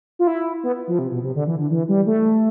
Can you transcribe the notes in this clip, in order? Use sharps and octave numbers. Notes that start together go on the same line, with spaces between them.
F4
E4
B3
F3
C3
B2
C3
D3
E3
D3
E3
G3
A3